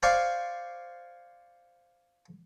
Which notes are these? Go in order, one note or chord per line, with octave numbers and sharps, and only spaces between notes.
C5 D5 F5 G#5 C#6 D6